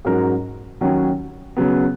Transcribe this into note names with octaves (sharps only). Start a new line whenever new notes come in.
G#2 F#3 C#4 F#4 A#4
D#2 D#3 F#3 C#4
C#3 F#3 B3